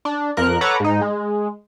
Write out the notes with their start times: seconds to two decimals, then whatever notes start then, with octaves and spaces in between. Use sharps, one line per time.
0.05 D4
0.37 F2 F3 A#4 F#6
0.61 A4 B4 C#5 F#5 A#5 D6
0.80 G#2 D#4
1.01 G#3